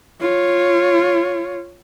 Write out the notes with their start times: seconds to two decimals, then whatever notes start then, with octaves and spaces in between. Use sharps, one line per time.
0.21 F4 C#5